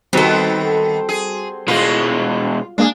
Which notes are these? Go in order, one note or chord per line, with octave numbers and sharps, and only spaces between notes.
D#3 G3 B3 C4 F#4 A4 C6
G#4
B2 G#3 F4
G#3 A#3 D4 G#4